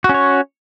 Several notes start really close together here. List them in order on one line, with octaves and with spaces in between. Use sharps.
F#4 C#4 C#5